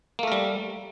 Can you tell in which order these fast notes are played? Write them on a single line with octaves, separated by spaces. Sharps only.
A#3 A3 A#4 G3